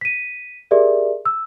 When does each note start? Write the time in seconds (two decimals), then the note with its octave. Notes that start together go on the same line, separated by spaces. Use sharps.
0.01 B6 D#7
0.71 G4 G#4 A#4 D5 E5
1.25 E6